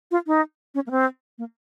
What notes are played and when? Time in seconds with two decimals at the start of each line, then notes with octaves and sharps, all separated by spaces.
0.11 F4
0.27 D#4
0.75 C#4
0.87 A#3
0.91 C4
1.38 A#3